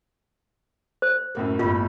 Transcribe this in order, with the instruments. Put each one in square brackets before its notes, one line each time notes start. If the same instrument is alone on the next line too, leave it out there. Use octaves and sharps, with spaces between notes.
[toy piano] C5
[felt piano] F#2 A2 A#3
[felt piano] G1 A2 B5 [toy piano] F4